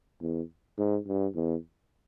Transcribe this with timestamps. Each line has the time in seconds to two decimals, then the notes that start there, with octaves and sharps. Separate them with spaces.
0.21 E2
0.78 G#2
1.07 G2
1.35 E2